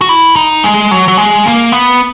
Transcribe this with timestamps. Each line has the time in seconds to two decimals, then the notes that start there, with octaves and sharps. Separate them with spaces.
0.01 F#4
0.09 E4
0.36 D#4
0.64 G#3
0.91 F#3
1.08 F#3
1.18 G#3
1.46 A#3
1.72 B3